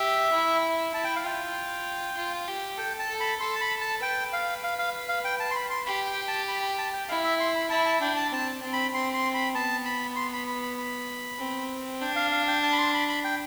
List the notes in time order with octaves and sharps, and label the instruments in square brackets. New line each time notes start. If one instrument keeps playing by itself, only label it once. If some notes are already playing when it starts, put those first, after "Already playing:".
Already playing: [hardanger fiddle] G4 [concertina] E5
[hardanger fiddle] E4
[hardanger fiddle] E4 [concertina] A5
[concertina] G5
F5
[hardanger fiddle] F4 [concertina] G5
[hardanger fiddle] F4
G4
[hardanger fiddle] A4 [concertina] G5
[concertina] A5
[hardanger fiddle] A4
[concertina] B5
[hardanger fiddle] A4 [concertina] C6
[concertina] A5
B5
A5
[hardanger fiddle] B4 [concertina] G5
[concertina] F5
F5
F5
F5
G5
A5
C6
B5
C6
[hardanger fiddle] G4 [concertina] B5
[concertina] G5
A5
B5
B5
A5
G5
[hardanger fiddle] E4 [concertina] F5
[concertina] E5
C6
B5
[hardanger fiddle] E4 [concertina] A5
[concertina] A5
[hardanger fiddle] D4 [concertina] G5
[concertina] A5
[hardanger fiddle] C4 [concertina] A5
[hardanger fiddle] C4
[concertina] B5
[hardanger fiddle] C4 [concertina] C6
[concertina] C6
B5
[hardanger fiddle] B3 [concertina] A5
[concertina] B5
C6
B5
B5
B5
B5
[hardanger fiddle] C4
[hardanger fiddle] D4 [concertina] G5
[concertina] F5
F5
G5
A5
B5
C6
B5
B5
G5